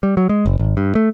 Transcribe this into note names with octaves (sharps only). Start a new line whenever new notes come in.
G3
F#3
G#3
F#1
G#1
G2
A3